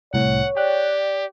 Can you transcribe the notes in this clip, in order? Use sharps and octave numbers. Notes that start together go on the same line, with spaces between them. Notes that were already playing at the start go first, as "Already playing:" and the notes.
C2 A2 C#5 F#5
G4 D5 G5 F#6